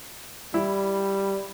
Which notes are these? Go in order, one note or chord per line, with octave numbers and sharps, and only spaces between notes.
G3 E4